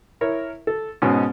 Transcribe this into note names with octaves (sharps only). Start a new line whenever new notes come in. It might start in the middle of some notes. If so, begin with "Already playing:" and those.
E4 A#4 C#5
A4
G#2 B2 C#4